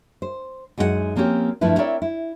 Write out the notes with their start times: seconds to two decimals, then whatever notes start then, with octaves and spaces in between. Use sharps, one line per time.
0.22 C5
0.78 F#2 G#3 D#4 E4 F#5
1.16 F3 A#3 C4 C#4 G4
1.61 G2 F3 A3 E4 B4
1.78 C4 E4 A#4 C#5 D5 E5
2.02 E4